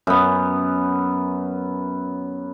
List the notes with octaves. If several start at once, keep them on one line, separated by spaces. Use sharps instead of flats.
F#2 B3